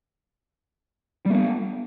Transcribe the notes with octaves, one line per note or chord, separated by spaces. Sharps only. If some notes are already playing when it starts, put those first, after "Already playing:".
G3 A#3 B3